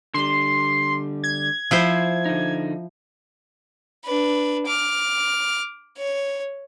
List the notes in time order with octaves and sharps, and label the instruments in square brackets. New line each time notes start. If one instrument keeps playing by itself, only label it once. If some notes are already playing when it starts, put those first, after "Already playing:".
[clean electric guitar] D3 G3 [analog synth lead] C6
[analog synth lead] G#6
[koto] F3 E4 C5
[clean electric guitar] D3 D#4
[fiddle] D4 B4
D6 F6
C#5